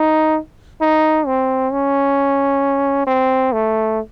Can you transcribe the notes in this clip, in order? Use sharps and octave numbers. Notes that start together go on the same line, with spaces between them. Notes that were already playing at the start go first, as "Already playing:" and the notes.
Already playing: D#4
D#4
C4
C#4
C4
A3